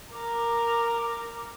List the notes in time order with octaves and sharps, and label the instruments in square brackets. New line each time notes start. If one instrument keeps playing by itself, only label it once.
[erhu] A#4 [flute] D6